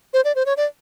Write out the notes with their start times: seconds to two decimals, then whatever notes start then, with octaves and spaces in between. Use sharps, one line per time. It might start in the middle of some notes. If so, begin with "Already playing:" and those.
0.13 C5
0.25 D5
0.36 C5
0.46 C#5
0.57 D5